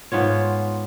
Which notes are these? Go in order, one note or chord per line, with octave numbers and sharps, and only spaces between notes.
G#2 B3 F4 C#5